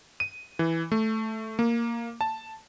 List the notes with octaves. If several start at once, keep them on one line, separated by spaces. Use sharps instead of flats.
D#7
E3
A3
A#3
A5